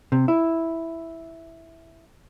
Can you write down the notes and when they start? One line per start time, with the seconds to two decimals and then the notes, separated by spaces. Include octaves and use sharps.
0.12 C3
0.28 E4